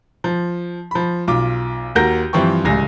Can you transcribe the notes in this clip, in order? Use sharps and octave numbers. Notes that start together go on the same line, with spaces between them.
F3
F3 B5
B1 F4 D6
D#2 F#4 A#4 G6 A#6
G2 E3 F3 C4 G5 C#6
D1 C#2 G3 G#5 A#6